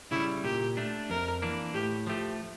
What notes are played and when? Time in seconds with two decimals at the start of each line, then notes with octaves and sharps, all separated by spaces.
0.11 C#3 G3 E4
0.44 A#2 G4
0.77 A3 D4
1.10 F2 A#4
1.42 E3 A#3 D4
1.74 A2 G4
2.07 F3 A3 G4